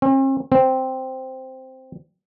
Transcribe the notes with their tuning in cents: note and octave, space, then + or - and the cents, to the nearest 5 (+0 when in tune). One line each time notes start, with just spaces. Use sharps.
C4 +45
C4 -5